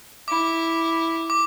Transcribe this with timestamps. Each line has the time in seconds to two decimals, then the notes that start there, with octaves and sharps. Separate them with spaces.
0.28 E4 D6
1.30 D6